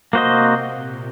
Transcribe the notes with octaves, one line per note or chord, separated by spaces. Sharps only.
C3 A#3 F#4 C5 D#5
A#2